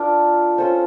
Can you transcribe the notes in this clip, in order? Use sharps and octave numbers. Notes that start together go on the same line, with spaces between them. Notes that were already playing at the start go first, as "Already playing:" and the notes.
Already playing: D4 F4 A#4 D5
C#4 F4 A4 C5